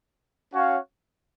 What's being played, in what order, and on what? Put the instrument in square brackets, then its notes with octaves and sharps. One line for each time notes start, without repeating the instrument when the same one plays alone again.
[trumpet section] C#4 F#4 C#5 F5